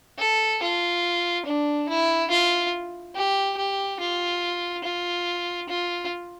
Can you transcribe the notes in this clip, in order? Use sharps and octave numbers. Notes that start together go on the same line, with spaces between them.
A4
F4
D4
E4
F4
G4
G4
F4
F4
F4